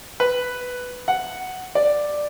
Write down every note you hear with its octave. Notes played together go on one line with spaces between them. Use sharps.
B4
F#5
D5